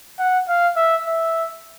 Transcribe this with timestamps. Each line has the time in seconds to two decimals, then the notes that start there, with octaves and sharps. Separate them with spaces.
0.19 F#5
0.48 F5
0.76 E5
1.06 E5